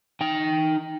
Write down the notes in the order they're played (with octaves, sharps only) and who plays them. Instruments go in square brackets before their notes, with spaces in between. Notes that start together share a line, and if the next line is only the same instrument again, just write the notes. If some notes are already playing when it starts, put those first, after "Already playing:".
[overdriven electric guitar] D#4 G5